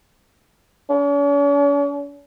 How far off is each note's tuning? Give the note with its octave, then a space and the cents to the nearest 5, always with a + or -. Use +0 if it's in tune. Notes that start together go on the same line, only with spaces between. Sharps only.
C#4 +45